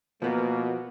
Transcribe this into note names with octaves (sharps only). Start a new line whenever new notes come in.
B2 F3 A#3 B3